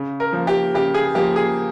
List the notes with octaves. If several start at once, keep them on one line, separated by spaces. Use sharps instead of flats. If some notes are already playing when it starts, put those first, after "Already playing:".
Already playing: C#3
A#4
F3 A#3
G4
C#3 G4
G#4
F3 A#3 G4
G#4